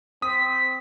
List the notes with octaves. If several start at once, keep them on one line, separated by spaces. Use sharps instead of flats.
C4 D#6 B6